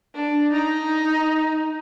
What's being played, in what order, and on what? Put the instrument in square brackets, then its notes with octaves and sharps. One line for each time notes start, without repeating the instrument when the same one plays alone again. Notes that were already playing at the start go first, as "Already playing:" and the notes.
[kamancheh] D4
D#4